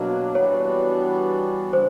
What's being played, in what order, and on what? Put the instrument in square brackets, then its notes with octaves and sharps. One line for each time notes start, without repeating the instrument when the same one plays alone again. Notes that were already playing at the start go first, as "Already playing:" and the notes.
Already playing: [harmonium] B2 F#3 A#3 D4
[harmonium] E3 G3 B3 D4 F#4 [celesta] C#5
[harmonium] C#3 [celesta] C5